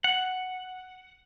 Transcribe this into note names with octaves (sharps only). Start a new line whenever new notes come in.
F#5